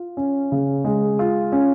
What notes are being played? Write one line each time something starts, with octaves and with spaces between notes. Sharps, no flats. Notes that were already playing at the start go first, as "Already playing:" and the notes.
Already playing: F4
C#4
C#3
G#3
F4
C#4